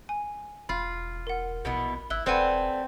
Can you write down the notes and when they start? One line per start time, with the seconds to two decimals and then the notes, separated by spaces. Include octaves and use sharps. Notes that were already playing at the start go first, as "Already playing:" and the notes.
0.09 G#5
0.69 E1 F4 B5
1.27 A#4 F#5
1.65 A#1 B2 E3 B3
2.10 G#1 E4 E6 F#6 G7
2.26 E1 A3 C4 B4 D5 F#5 G#5 B5